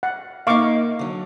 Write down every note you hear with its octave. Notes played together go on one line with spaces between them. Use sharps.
F#5
A#3 D#4 F5 C#6 D6
D3 F#3